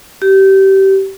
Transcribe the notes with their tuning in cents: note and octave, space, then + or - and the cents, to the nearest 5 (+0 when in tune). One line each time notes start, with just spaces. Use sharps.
G4 -25